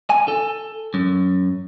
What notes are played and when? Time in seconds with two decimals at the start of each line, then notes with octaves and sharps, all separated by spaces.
0.10 G#5
0.28 A4
0.94 F#2